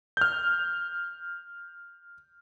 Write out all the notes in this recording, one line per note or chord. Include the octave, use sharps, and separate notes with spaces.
F6 G6